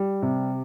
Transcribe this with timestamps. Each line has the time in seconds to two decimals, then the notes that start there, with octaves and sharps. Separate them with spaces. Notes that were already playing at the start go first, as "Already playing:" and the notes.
Already playing: G3
0.22 C3